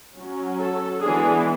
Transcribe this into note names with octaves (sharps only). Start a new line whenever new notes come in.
F#3 C#4
A4
E3 G#3 B3 D4 G#4